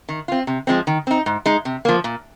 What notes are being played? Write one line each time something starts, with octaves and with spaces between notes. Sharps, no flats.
D#3
C4 F4
C3
F3 G#3 C4
D#3
C4 D#4
G#2
G#3 D#4
C3
F3 A#3
A#2